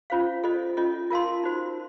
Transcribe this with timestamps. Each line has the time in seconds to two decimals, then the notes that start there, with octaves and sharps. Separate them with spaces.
0.10 C#4 F4 C5 F5
0.44 F4 A4 C5 D#5
0.77 C#4 F4 A4 D#5
1.11 F4 A#4 F5 A5 C6
1.44 D#4 F#4 C5